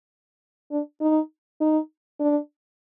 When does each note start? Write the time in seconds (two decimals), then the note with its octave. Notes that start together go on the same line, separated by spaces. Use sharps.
0.71 D4
1.01 D#4
1.61 D#4
2.20 D4